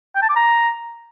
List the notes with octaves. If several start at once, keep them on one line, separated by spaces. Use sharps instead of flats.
G5
A5
D6
A#5